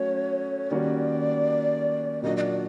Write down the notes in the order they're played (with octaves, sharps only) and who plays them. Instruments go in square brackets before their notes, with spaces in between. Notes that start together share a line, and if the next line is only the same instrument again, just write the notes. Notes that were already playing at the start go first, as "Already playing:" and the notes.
Already playing: [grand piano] F#3 A3 C#4 F#4 [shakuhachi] C#5
[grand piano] D#3 G3 A#3 C#4 F#4 [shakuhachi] D5
[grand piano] A#2 F#3 A#3 D4 F#4 [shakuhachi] D#5
[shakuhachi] D#5
D5